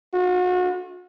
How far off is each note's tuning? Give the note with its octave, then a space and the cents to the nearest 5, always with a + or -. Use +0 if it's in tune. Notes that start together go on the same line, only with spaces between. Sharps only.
F#4 -35